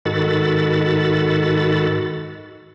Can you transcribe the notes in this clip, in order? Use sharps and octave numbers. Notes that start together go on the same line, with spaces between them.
G#2 D#3 F#4 A4 B5 A6